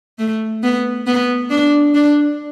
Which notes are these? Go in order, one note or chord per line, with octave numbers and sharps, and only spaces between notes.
A3
B3
B3
D4
D4